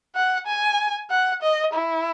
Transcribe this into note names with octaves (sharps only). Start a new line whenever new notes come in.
F#5
G#5
F#5
D#5
E4